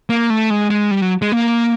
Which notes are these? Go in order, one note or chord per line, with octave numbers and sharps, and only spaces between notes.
A#3
A3
G#3
G#3
G3
F#3
G#3
A#3